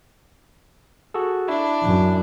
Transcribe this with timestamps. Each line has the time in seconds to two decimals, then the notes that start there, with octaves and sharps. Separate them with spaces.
1.14 F#4 G#4 A4
1.48 D4 E4
1.82 F#2